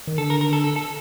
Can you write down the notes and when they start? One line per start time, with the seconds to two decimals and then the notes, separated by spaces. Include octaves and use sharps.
0.07 D#3
0.18 D3 A4
0.30 A#4
0.41 A#4
0.53 A4
0.64 A4
0.76 A4